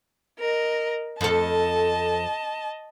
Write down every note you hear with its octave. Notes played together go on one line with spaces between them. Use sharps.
A#4 D#5
F2 A4 D#5 A5